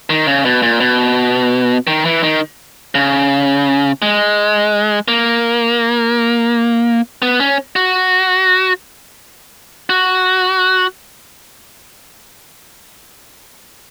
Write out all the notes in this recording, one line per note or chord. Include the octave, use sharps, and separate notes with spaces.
D#3
C#3
B2
A#2
B2
D#3
E3
D#3
C#3
G#3
A#3
B3
C#4
F#4
F#4